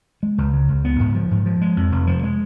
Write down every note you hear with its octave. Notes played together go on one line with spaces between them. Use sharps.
G#3
C#2
C#3
C#2
B3
G#2
F3
G#2
F3
G#3
F2
F1
F3
G#3